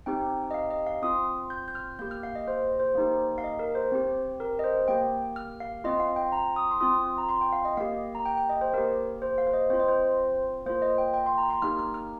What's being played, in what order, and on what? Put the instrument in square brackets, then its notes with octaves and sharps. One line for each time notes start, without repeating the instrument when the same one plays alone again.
[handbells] C4 D#4 G4 G5
D#5
F5
D#5
F5
C4 F4 D#6
G6
G6
F6
A#3 G4 G6
F6
F5
D#5
C5
C5
A#3 D#4 G4
F5
D#5
A#4
C5
C4 G4
A#4
D#5
C5
A#3 G4 G5
F6
F5
C4 F4 D#5
F5
G5
A#5
D#6
C6
C4 F4 D#6
A#5
C6
G5
F5
D#5
A#3 G4 F5
A#5
G5
G5
D#5
C5
A#3 G4 A#4
C5
F5
C5
D#5
C4 F4 C5
D#5
C5
A#3 F4 C5
D#5
G5
G5
C6
A#5
C6
A#3 D#4 G4 F6
F6
F6